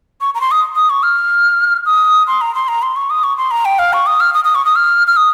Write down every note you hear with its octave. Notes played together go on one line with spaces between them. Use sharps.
C#6
A#5
C6
D#6
D#6
C#6
F6
D#6
C6
A#5
C6
A#5
C6
C#6
D#6
C#6
C6
A#5
G5
F5
C#6
D#6
F6
D#6
D#6
C#6
D#6
F6
F6
D#6